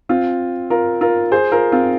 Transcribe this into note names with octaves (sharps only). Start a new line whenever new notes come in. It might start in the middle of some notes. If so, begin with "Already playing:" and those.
C4 F4
F4 A#4
F4 A#4
G#4 C5
F4 A#4
C4 F4